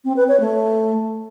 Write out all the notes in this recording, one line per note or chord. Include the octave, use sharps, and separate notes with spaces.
C4
B4
C#5
A3